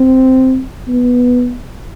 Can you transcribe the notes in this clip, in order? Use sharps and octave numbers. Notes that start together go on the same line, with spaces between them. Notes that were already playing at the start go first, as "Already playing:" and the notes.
Already playing: C4
B3